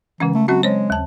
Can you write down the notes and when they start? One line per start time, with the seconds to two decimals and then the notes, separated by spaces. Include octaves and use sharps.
0.20 C#3 E3 G#3 C#4
0.35 A3
0.48 F#3 C4 C#4 F#4
0.63 G#3 C5 C#5
0.90 D#2 A5